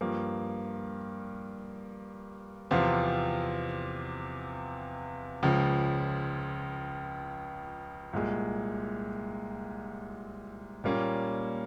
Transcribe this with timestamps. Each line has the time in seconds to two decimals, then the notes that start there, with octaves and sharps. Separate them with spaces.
0.01 G2 F3 A#3
2.71 E2 C3 F3 C4 F4
5.43 C#2 C#3 F3
8.13 C2 A#2 G#3
10.84 A#2 G3 A#3 C#4